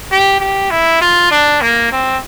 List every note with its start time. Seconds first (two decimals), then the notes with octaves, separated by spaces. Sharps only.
0.11 G4
0.40 G4
0.71 E4
1.01 F4
1.31 D4
1.61 A#3
1.92 C4